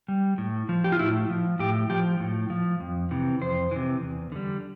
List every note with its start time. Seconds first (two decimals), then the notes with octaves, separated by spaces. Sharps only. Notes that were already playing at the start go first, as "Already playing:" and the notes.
0.08 G3
0.38 A2
0.69 F3
0.84 G4
0.92 F4
0.99 A2 E4
1.30 F3
1.59 A2 G4
1.90 F3 G4
2.20 A2
2.50 F3
2.80 F2
3.11 C3 E3
3.42 F2 C5
3.71 C3 E3
4.02 E2
4.32 D3 G3